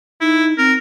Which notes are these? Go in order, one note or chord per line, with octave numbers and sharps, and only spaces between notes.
D#4 E4
C4 A#4